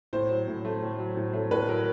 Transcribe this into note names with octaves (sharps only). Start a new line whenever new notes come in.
A2 C5
F#3
A2
A3
A2
F#3
A2
A3
A2 B4
F#3 A#4